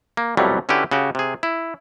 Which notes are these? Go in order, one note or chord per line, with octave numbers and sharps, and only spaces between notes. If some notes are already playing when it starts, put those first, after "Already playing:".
A#3
C2 F2 B2 F#3 G3 A3
D3 C#4 E4 F#4 G4 B4
C#3 F#4 G4
C3 G#4
E4